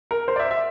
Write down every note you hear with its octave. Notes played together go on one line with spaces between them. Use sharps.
A#4
C5
D5
E5
E5